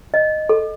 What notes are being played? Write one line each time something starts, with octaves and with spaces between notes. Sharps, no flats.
D#5
A4